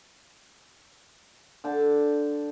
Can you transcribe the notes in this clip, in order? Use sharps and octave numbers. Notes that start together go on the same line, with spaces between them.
D3 G5 A5